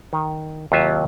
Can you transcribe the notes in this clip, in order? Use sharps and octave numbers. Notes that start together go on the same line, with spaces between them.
D#3
D#2 C3 F#3 F4 E5